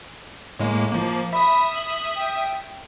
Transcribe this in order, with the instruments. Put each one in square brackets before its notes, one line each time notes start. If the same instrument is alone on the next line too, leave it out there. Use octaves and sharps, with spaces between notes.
[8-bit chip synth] A2 G#3 A#3
F3 A#3
[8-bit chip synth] E5 D#6 [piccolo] B5
[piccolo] F#7
G5